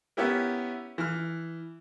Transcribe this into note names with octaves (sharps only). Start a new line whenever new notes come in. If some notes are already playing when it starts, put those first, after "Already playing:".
B3 C#4 E4 G4 A#4
E3 F6